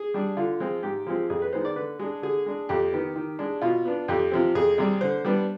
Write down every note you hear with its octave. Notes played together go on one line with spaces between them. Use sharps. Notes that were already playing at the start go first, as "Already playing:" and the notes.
Already playing: G#4
G3 D4
D3 F4
F3 G#3 C4
G#2 G4
F3 G#3 C4
F2 G#4
B4
D#3 G#3 B3 C5
D5
D3 B4
G#3 D4 G#4
D3 G#4
G#3 D4
F2 G4
D#3 B3
D#3
G#3 D4
B2 F4
B3 D4
F2 G4
C3 F3 C4
F2 G#4
C3 G3
D3 C5
G3 B3 D4